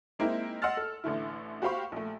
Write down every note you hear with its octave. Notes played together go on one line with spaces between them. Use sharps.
G#3 A#3 C4 D#4 E4
D#5 F#5 C6 E6 F6 A6
A4
A1 D3 A3 E4
F#4 G4 C5 F5 B5 C#6
A#1 A3